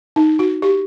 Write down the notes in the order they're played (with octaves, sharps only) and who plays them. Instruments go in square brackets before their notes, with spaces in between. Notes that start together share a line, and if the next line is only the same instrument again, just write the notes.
[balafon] D#4
F#4
G4